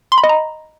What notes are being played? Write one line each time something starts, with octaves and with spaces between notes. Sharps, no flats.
C6
B5
D#5
A#5